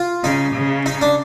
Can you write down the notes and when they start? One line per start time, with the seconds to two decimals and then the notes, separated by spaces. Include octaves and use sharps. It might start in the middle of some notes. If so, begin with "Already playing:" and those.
Already playing: F4
0.24 C#3 D#4
0.55 C#3
0.86 D#4
1.02 D4